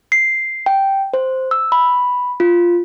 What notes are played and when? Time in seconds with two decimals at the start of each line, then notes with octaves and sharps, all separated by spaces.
0.12 C7
0.66 G5
1.13 C5
1.51 E6
1.72 B5
2.40 F4